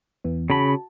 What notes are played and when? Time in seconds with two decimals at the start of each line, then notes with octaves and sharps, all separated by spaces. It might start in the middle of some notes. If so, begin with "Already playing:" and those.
0.24 E2 E3 B3
0.50 C#3 F#4 A5 B5